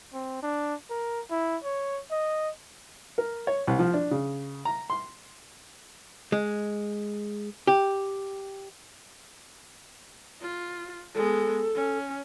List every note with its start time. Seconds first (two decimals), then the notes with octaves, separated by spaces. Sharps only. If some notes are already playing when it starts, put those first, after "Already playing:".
0.14 C4
0.42 D4
0.90 A#4
1.31 E4
1.64 C#5
2.11 D#5
3.18 A#4
3.47 C#5
3.67 C2
3.79 F3
3.94 D4
4.11 C#3
4.65 A#5
4.90 C6
6.32 G#3
7.67 G4
10.42 F4
11.15 G#3 B3 A4
11.75 C#4